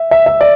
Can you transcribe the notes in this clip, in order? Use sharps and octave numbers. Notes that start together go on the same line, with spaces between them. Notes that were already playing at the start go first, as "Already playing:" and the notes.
Already playing: E5
E5
E5
D5